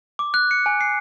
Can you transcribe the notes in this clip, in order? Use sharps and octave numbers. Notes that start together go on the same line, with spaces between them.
D6
F#6
C#7
G#5
C7